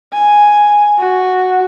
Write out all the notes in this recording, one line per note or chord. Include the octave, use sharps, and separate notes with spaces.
G#5
F#4